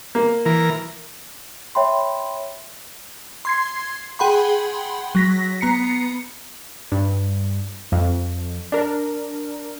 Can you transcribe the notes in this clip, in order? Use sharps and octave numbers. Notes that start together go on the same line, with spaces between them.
A#3
E3 A#4
C#5 E5 G5 B5 C6
C6 G#6 C7
G#4 F#5 G5 B5 C6
F#3 A#6 B6
B3 A#5 C7 C#7
G2
F2
D4 A#4